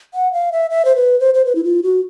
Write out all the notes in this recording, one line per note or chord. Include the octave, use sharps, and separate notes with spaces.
F#5
F5
E5
E5
C5
B4
C5
C5
B4
E4
F4
F#4